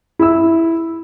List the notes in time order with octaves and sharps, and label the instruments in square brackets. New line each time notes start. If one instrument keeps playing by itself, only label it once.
[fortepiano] E4 E6